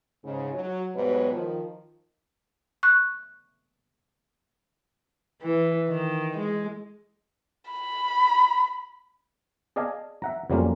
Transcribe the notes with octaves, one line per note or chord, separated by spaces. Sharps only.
G#2 C#3
F#3 F#4
G#2 B2 F#3 G3 B4 C#5
D#3 F3
C#6 F#6
E3
D#3
G#3
B5
G#4 D5 D#5 F5 G#5 A5
E5 F#5 A#5
F2 F#3 G3 A#3 C#4 F4